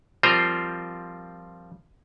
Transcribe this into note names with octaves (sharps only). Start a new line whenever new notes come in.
F3 G3 C4 F4 A#4 C5